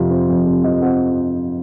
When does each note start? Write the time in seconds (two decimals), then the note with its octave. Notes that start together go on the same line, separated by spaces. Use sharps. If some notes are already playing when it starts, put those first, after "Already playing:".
Already playing: F2 C3 F3
0.10 C4
0.29 F2
0.47 C3
0.64 F3 D#5
0.82 C4 F#5